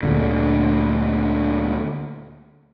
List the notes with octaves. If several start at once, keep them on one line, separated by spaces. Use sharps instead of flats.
D2 A#2 D3